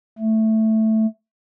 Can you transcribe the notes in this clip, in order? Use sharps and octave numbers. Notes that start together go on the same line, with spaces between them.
A3